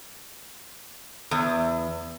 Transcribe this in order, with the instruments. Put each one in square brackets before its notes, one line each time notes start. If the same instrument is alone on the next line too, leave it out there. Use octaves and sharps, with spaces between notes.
[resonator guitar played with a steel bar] E2